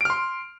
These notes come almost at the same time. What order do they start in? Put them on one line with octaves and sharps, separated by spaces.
D7 F6 C6